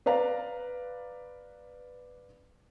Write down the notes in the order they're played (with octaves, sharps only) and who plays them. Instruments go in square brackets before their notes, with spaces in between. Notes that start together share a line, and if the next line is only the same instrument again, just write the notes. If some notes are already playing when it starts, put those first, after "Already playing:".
[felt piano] B4 D5 F5 A#5